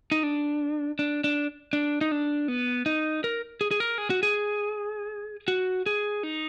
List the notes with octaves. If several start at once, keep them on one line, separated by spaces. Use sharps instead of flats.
D#4
D4
D4
D4
D4
D#4
D4
B3
D#4
A#4
G#4
G#4
A#4
G#4
F#4
G#4
F#4
G#4
D#4